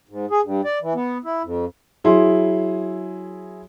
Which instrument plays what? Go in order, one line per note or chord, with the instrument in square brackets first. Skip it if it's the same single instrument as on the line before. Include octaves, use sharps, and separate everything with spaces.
[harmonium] G#2
G#4
G2
D5
E3
B3
E4
F2
[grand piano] F#3 E4 G#4 C6